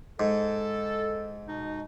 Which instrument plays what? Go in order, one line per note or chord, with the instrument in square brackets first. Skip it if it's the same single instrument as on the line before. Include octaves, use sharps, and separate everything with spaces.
[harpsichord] G#2 [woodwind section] A4
[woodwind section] B2 D#4